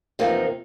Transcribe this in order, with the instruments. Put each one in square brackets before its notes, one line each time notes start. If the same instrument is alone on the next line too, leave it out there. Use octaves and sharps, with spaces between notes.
[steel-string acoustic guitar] E2 C3 F3 A#3 D#4